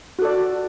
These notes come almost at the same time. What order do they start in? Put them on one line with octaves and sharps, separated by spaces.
F#4 A4 D5